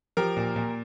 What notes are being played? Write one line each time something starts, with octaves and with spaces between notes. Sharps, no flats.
F3 G4 A#4
A#2
A#2